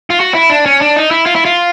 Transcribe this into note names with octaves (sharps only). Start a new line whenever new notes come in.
F4
F#4
E4
D4
C#4
D4
D#4
E4
F4
E4
F4